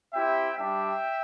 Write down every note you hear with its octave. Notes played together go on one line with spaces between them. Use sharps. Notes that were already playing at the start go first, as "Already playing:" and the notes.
C4 E4 G4 E5 G5
G3 D4 G4 E5 G5